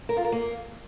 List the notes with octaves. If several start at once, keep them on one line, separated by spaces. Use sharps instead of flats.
A#4
F4
A#4
A#3